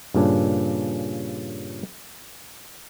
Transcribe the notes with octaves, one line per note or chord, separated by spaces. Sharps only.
G2 A#2 C#3 D4